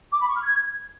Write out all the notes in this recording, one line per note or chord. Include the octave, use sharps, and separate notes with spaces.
D6
B5
C#6
F6
G#6